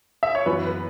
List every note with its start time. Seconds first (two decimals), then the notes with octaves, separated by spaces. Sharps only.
0.23 E5
0.35 C#5
0.46 F#2 E3 B3 B4
0.66 B4